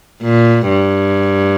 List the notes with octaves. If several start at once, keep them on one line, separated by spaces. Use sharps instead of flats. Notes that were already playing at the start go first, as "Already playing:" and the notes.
A#2
G2